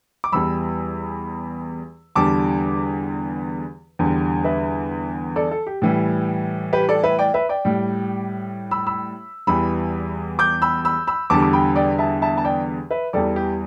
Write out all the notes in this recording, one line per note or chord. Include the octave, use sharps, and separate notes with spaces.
D6
E2 E3 G3 B5 E6
E2 D3 G3 A5 D6
E2 D3 G3
B4 E5
A4 D5
A4
G4
A2 E3 G3
G4 B4
A4 D5
B4 E5
D5 G5
B4 E5
D5 G5
A2 G3
B5 E6
B5 E6
E2 E3 G3 B5 E6
D6 G6
B5 E6
B5 E6
B5 E6
E2 D3 G3 A5 D6
D6
G5 B5
D5 G5
E5 A5
E5 A5
A5
D5 G5
B4 E5
E2 E3 G3 A4 D5
G4